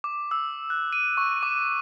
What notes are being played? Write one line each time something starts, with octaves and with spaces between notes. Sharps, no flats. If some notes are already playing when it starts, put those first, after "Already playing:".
D6
E6
F#6
D#7
C#6
D6